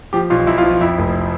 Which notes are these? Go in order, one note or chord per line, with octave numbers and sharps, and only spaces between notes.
F3 G4
B1 F4
B1 E4
F4
F3
F4
F2 E4
F1